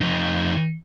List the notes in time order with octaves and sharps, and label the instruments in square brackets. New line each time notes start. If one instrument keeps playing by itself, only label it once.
[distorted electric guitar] F2 D#4